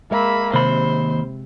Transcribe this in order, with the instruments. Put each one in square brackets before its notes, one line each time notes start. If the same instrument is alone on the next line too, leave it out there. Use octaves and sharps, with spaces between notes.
[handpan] G#3 E5 [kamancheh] A#3 B5
[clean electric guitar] D#2 B5 [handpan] C3 [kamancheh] C5